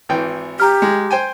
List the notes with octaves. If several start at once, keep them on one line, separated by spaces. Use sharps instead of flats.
G#1 E3 G5
G4 A#5 F6
G#3
C5 G5 G#5